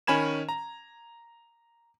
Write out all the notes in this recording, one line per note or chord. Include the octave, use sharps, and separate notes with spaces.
D#3 C#4 G#5 B5 G#6 E7
A#5